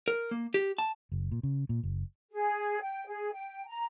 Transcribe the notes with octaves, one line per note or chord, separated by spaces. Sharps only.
A#4
A#3
G4
A5
F#1
A#2
C#3
A#2
F#1
G#4
G5
G#4
G5
A#5